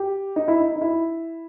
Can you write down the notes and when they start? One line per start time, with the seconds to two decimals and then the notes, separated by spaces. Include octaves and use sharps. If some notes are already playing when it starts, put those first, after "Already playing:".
Already playing: G4
0.36 D#4
0.48 E4
0.60 D#4
0.76 D#4
0.81 E4